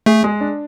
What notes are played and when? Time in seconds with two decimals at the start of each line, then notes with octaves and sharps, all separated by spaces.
0.06 A3 G#4
0.24 G#3
0.40 D4